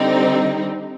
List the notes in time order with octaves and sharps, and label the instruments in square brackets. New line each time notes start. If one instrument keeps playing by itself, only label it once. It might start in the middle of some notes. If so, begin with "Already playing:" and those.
Already playing: [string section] D3 G3 C4 D#4